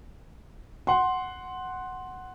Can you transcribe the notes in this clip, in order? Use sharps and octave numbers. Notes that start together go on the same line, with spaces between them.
F#5 C6